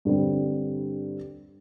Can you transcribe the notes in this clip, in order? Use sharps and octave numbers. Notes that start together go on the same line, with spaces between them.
G2 D3 G3 C4